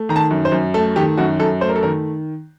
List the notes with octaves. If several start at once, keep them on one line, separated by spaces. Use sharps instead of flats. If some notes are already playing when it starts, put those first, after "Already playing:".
Already playing: A3
D#3 A#5
A5
F#2
C5
F#2
A3 A4
D#3 G4
F#2 F#4
F#2 A4
A3 C5
A#4
A4
D#3 A#4